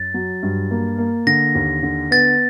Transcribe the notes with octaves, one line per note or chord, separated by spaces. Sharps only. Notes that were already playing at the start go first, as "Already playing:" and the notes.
Already playing: F#2 A6
F#3
G2
A#3
A#3
D3 A#6
D#2
D3
B3 A6